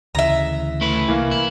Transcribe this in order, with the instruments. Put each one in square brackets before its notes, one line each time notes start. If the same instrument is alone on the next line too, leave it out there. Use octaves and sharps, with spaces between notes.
[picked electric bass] D2 C#3 E3 [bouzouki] E5 A#5
[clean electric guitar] A3 E4 B4
[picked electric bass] C2 [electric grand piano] E3 A#3 F5
[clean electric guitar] E4